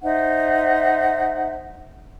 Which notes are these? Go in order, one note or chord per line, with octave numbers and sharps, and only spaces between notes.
D#4 C5 E5 F#5